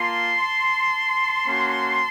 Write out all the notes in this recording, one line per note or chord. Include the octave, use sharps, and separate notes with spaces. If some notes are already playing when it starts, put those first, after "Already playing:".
Already playing: A#3 F4 A5 C6
A#3 C#4 F#4